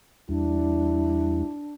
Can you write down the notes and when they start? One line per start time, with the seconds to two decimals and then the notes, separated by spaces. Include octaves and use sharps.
0.29 E2 G3 D4 E4